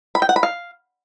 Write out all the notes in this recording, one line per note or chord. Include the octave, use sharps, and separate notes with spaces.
B5
G5
F#5
B5
F5